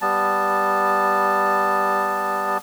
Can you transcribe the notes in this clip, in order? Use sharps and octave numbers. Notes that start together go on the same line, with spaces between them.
G3 B3 A5